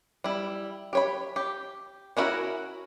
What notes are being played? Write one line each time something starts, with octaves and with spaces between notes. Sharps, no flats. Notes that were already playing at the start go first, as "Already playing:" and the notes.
G3 E4
G4 C#5 B5
G4
C#4 D4 E4 F#4 A#4